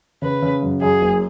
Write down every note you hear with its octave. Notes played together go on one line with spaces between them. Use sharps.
C#3 B4
C#3
F#2
F#2 G#4
F#1